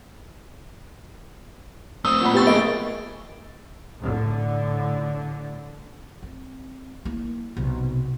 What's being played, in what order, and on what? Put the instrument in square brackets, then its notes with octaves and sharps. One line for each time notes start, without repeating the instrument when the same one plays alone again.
[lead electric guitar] A3 C4 [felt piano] D#6 [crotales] E6
[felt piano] A#2 F#5 B5
[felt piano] B3 [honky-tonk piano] G4 C#6 [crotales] E6 A6
[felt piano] A#3 G#4 [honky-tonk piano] D#5 [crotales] D7
[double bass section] A2 D3
[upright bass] C4
A#3 E4
B1 C3